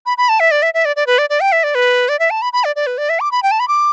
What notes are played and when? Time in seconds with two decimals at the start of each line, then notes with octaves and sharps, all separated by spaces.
0.06 B5
0.18 B5
0.29 A5
0.40 E5
0.51 D5
0.62 E5
0.74 E5
0.85 D5
0.96 D5
1.07 B4
1.18 D5
1.30 D5
1.41 G5
1.52 E5
1.63 D5
1.75 B4
2.09 D5
2.19 E5
2.31 A5
2.42 B5
2.53 B5
2.64 D5
2.76 D5
2.87 B4
2.98 D5
3.09 E5
3.20 D6
3.32 B5
3.43 G5
3.51 A5
3.60 B5
3.68 D6